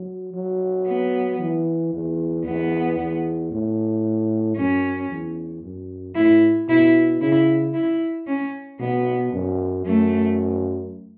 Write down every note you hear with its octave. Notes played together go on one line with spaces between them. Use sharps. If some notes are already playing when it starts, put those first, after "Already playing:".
Already playing: F#3
F#3
B3
E3
E2
E2 B3
E2
A2
F#2 C#4
E2
F#2
A2 E4
B2 E4
C#3 E4
E4
C#4
B2 B3
F#2
F#2 A3